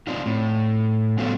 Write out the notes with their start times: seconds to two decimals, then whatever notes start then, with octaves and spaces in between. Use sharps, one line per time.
0.07 C4 D4 D#4 F4
0.26 A2
1.18 G3 B3 C#4 F4 F#4 A4